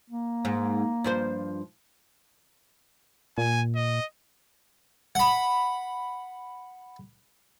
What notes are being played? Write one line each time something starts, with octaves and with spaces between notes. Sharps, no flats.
A#3
G#2
G2 F3 C5
A#2 G#5
D#5
F#5 B5